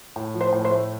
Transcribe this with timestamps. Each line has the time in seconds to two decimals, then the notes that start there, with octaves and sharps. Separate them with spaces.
0.16 A2
0.34 F3
0.41 C5
0.52 A2
0.65 C5
0.71 A3